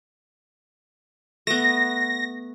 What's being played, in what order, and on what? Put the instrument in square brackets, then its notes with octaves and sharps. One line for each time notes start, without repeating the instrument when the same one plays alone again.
[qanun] A3 B3 [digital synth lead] A#6